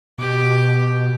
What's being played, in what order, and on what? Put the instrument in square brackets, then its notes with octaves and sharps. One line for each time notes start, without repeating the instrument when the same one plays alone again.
[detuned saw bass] B2 [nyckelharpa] G4 D6